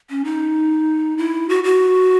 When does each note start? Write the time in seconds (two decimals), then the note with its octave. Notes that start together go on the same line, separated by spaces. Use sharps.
0.10 C#4
0.25 D#4
1.18 E4
1.49 F#4
1.64 F#4